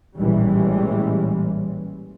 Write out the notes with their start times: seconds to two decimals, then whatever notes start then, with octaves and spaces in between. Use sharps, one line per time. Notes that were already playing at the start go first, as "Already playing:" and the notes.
0.18 A1 A#2 E3 G3 G#3 C#4